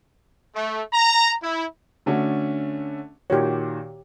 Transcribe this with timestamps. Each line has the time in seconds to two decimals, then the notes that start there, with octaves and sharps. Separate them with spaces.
0.55 A3
0.93 A#5
1.43 E4
2.06 D3 A3 C#4 D4 F#4
3.30 A#2 D#3 F#4 G4 C#5